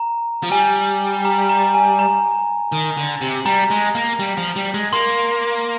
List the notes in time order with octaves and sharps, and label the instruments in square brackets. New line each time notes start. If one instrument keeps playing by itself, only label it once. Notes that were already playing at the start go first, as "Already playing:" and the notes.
Already playing: [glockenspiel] A#5
[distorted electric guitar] F3
[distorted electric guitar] G3 [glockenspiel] G#5
[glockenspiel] A#5
A#5
G#5
A#5
[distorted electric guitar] D#3
D3
C3
[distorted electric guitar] G3 [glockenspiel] A#5
[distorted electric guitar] G#3
A#3
G3
F3
G3
G#3
[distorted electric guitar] A#3 [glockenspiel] C6